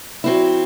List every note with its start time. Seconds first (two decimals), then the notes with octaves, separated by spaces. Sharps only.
0.24 F#3 C4 E4